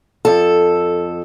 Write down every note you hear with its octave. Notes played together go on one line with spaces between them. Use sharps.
F2 A4